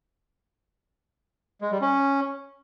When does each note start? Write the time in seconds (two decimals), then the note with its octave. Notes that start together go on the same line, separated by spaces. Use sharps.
1.62 G#3
1.72 G3
1.82 C#4